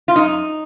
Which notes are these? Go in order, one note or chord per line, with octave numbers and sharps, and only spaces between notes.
F4
F#2 D#4